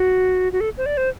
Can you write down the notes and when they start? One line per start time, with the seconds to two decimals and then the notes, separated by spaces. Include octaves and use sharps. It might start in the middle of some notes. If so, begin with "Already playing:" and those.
Already playing: F#4
0.53 F#4
0.61 A4
0.78 C5
0.86 D5
0.97 C5